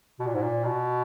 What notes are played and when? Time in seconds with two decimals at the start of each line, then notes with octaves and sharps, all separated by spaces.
0.19 B2
0.27 A#2
0.35 G#2
0.42 A#2
0.65 B2